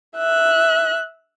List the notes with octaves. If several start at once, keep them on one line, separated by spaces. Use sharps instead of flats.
E5 F#6